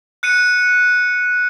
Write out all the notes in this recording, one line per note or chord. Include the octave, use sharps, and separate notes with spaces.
F#6 C#7 D#7